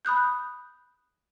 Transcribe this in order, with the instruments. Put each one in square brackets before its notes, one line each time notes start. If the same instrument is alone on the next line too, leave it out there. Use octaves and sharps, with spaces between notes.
[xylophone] B5 D#6 F#6 G6